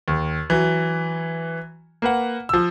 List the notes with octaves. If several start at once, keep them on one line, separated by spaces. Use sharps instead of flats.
D#2
E3 F#3
A#3 B4 F#5
F3 E6